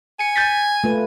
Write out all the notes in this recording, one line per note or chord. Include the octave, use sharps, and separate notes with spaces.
G#5 C#7 D#7
G6 A6 B6
A3 F4 B4